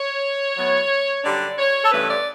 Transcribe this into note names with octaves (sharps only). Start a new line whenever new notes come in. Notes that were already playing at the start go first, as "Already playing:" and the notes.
Already playing: C#5
A2 F#3 B3
F#2 D3 G3 D4 D5
C#5
A4
G2 E3 A3 C#4 B4
D5